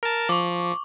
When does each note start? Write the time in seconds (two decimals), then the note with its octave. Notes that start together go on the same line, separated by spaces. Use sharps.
0.03 A#4 A5
0.29 F3 C#6 D6